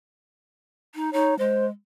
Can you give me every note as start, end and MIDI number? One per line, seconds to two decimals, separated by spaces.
0.95 1.12 63
1.13 1.37 63
1.13 1.34 73
1.39 1.70 56
1.39 1.66 72